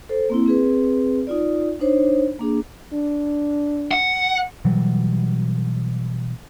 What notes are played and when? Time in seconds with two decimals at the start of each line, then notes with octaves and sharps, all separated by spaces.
0.09 A4 C5
0.30 A#3 C4 E4
0.46 C4 G#4 B4
1.27 D#4 F4 D5
1.80 D4 D#4 C5 C#5
2.39 A#3 D4 G#4
2.93 D4
3.91 F#5
4.65 B2 E3 F#3 G3